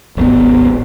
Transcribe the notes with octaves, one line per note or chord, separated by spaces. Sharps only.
D1 G#1 B3